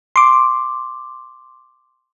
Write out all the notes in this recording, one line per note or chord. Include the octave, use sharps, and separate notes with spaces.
C6 D6